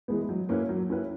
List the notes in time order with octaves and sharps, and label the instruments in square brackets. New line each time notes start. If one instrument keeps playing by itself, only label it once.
[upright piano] E3 G#3 B3
F#3
A#3 C#4 E4 B4
F#3
A#3 C#4 E4 B4